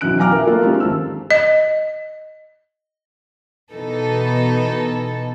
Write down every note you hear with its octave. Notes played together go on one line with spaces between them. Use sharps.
B1 E3 F#3 C#4 F#6 D7
F5 G5 G#5 A#5 D6 F6
A#4 E5
A#3 F4 A4
G#3 C4 C#4 D#4 F4 G4
G#1 A5 E6
D#5
B2 E3 D#4 A4